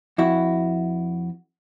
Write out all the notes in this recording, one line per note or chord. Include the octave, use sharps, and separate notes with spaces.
F2 E4 F#4